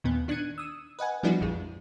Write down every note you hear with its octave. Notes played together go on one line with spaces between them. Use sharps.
D#2 A#2 B3
D#3 D4 F#6 G#6 C#7 D#7
D#6 E6
B4 D#5 F#5 G#5
F3 G3 B3 D4 E4 F#4
A#1 F2 G#3